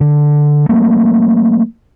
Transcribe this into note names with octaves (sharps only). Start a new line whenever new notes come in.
D3
F#3 A3 A#3